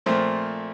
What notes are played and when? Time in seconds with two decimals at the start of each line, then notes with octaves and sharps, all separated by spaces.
0.06 A#2 F3 A3 C4